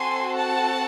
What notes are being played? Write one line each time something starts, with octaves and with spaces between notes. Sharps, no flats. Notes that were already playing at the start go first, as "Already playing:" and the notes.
Already playing: C4 F#4 A4 G#5 C6
F#5 A5